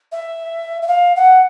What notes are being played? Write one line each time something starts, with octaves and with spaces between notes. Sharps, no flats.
E5
E5
F5
F#5